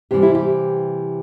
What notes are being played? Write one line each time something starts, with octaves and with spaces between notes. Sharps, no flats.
C3 E3 G3 G4
E4
G4